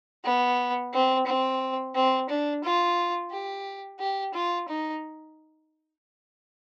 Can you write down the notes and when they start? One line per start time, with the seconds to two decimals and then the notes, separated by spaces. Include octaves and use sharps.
0.24 B3
0.93 C4
1.26 C4
1.95 C4
2.29 D4
2.64 F4
3.31 G4
3.99 G4
4.34 F4
4.68 D#4